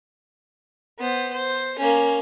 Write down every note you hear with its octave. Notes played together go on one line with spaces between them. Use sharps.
B3 C5
C5
A#3 C#4